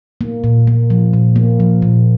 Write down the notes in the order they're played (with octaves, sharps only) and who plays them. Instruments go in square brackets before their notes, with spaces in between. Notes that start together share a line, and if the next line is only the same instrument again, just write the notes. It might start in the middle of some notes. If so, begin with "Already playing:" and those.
[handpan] A#3
A#2
A#3
F3
A#2
A#3
F3
A#2